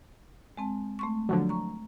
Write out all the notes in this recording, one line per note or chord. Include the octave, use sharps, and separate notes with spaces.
G#3 C4 A5
A3 C6 C#6
D3 F3 F#3
A#5 C#6